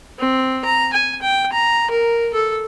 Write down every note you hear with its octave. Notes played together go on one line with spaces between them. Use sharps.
C4
A#5
G#5
G5
A#5
A#4
A4